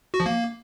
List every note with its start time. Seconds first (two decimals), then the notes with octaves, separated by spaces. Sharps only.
0.14 F#4
0.20 F3
0.26 A#3